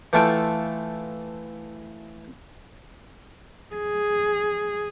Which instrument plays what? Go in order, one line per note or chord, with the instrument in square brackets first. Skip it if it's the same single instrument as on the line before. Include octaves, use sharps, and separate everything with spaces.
[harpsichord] E3 A3 F4 A4 E5 G5
[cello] G#4